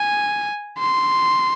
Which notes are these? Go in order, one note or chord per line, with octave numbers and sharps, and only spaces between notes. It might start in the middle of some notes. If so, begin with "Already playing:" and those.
Already playing: G#5
C6